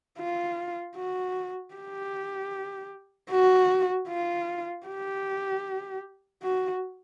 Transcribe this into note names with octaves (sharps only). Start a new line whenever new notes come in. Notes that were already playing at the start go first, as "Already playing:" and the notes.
F4
F#4
G4
F#4
F4
G4
F#4